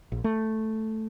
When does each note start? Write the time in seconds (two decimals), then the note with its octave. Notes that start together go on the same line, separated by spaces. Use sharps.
0.12 A#1
0.24 A3